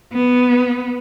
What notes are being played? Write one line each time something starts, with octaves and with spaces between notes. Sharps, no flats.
B3